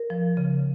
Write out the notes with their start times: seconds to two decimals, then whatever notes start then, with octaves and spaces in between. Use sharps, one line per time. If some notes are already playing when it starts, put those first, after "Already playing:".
Already playing: A#4
0.10 F3
0.37 C#3